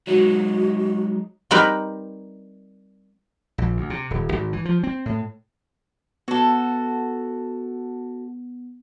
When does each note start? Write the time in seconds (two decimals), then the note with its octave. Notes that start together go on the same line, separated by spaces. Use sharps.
0.07 F#3 G#3 D#4 F#4
1.51 G3 C4 D#4 A#4 B4
3.58 A#1
3.77 D2
3.90 C3
4.11 D#1
4.32 G#1
4.53 E3
4.65 F3
4.83 C4
5.06 A2
6.28 B3 F#4 A4